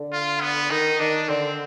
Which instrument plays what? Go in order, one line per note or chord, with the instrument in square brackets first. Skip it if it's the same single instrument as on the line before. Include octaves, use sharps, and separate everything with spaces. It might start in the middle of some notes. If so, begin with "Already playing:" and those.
Already playing: [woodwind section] D3
[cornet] F4
B3
[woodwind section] D#3 [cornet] D#4
[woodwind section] D#3 [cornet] D4
[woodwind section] D3 [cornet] C4